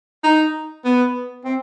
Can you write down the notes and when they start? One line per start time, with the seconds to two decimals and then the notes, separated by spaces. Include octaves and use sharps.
0.24 D#4
0.85 B3
1.45 C4